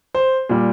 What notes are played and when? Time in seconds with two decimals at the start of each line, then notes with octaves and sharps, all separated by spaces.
0.15 C5
0.49 A#2 G3